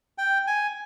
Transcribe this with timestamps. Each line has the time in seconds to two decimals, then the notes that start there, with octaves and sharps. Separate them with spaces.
0.18 G5
0.47 G#5